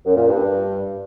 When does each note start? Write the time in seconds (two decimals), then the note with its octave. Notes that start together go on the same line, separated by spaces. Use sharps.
0.05 F#2
0.16 A#2
0.27 G2